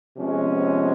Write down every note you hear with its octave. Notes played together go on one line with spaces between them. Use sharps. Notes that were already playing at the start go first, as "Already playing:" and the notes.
C3 F3 G#3 B3 C#4